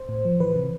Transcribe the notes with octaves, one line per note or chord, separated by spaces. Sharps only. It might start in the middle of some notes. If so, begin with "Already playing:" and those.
Already playing: C5
A2
F3
E3 B4
C3